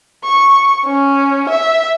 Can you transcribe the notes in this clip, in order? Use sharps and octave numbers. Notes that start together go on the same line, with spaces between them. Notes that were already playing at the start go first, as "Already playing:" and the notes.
C#6
C#4
E5